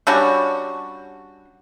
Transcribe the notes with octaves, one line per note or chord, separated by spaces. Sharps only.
G3 C#4 D4 F#4